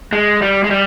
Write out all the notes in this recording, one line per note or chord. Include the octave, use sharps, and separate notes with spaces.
G#3
G3
G#3
G3